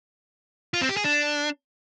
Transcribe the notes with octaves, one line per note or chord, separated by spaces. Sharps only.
F4
C4
G4
G#4
D4